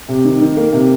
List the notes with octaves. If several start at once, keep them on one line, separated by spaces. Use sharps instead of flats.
C3
D#3
D#3
A#3
C3